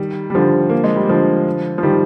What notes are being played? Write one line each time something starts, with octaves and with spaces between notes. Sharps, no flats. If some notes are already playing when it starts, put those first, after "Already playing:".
Already playing: D#3 G3
G3
D3 F3
A#3
G#3
G3
D3 F3
F3
D#3 G3